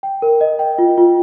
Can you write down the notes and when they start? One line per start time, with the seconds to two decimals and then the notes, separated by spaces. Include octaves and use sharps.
0.03 G5
0.22 A#4
0.41 D#5
0.59 G5
0.78 F4
0.98 F4